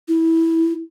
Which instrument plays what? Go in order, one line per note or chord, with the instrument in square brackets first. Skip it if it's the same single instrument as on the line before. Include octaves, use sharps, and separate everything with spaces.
[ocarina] E4